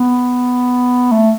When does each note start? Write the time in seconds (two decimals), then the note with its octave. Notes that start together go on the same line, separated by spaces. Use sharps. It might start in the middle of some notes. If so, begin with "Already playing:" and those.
Already playing: B3
1.12 A3